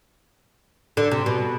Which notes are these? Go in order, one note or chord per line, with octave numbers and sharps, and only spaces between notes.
D3
C3
B2